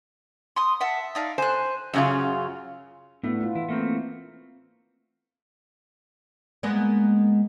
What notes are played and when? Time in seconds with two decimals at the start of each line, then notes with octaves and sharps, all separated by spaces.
0.56 C6 D#6
0.80 E5 F#5 A5
1.15 D#4 D5 F5
1.38 C5 G#5 F#6
1.94 F#2 C#3 F4 C#5 F5
3.24 A2 A3 B3 D4 E4
3.41 E4 F4
3.55 E3 E4
3.69 A3 A#3 C4
6.63 G#3 A#3 B3